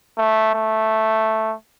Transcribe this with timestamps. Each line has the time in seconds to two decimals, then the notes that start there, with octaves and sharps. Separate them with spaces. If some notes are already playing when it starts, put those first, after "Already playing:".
0.18 A3
0.54 A3